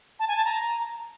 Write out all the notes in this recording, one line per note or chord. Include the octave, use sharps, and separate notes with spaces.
A5
G#5
A5
A#5